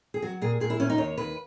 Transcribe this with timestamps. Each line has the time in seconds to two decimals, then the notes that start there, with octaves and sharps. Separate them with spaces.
0.14 G#4
0.22 F#3 F#4
0.41 A#2 G#4
0.60 A#2 G#4
0.70 E4
0.80 A#2 C#4
0.90 D#4
0.98 D#2 C#5
1.18 D#2 B4